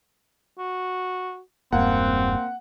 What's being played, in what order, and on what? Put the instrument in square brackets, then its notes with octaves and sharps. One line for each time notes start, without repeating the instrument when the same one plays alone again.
[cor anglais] F#4
[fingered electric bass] E1 G2 [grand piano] A#3 [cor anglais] C4 [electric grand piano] F#5